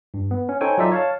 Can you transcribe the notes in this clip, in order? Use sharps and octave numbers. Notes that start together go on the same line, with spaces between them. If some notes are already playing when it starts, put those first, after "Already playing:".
G2
B3
C#4
D#4 A4 C5 C#5 G5 G#5
F#3 D#4 F4 A4 D5 E5
C#5 F5 A5